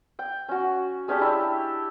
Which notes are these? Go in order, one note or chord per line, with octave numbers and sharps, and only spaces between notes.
G5
C#4 F#4
G#3 C#4 D4 G4
D4 E4 G4 E5